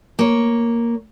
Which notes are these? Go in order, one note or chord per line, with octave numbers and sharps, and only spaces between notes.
A#3 C#5